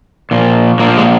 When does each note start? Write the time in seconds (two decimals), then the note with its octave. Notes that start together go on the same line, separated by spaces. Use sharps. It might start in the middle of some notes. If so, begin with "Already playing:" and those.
0.31 A#2 F3
0.79 A#2 F3 A#3
0.97 G#3